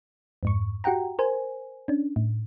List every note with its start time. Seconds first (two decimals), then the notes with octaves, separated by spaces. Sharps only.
0.43 F2 G#2 C#6
0.84 F#4 G4 F#5 G5 A#5
1.19 A#4 C5 G#5
1.88 C#4 D4
2.16 A2